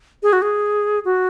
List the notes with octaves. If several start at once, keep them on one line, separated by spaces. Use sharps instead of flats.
G#4
F#4
G#4
F#4